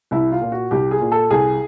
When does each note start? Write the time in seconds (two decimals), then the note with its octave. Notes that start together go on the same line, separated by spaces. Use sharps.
0.11 C2 E4
0.32 F4
0.41 A#2
0.52 F#4
0.71 C2 G4
0.91 G#4
1.01 A#2
1.12 A4
1.31 C2 G#4